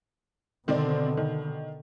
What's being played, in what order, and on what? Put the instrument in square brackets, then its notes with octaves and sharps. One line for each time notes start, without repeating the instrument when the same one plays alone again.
[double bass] B2 D3 [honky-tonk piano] D#3 C4 D5
[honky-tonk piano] D#3